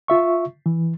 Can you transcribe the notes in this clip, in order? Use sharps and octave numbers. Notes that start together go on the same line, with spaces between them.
F4 E5 C#6
E3